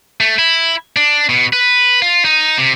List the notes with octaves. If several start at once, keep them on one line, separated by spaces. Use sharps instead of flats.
A3
E4
D4
B2
B4
F4
D#4
C3